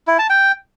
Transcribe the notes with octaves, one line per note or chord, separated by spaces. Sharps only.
E4
A5
G5